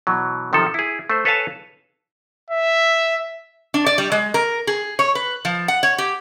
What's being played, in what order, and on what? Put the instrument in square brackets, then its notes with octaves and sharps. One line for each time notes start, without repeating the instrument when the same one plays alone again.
[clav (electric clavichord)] B2 E3 F#3
C3 D#3 F3 A4
E4 G#4
A3 C5
A4 B4 C#5 F5 G#5 A5
[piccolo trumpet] E5
[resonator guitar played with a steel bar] D4
D5
G3
G#3
A#4
G#4
C#5
B4
F3
F#5
C#5
G4